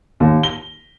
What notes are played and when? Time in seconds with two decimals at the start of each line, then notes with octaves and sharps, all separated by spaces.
0.20 D#2
0.43 G7